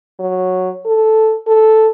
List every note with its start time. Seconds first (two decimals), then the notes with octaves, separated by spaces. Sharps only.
0.19 F#3
0.86 A4
1.47 A4